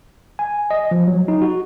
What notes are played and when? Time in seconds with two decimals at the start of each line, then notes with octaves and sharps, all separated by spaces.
0.39 G#5
0.71 D#5
0.91 F3
1.07 F#3
1.28 D#4
1.42 F#4